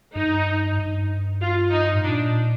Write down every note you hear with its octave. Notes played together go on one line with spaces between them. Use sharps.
G2 D#4
G2
F4
D#4
A2
A#2 D4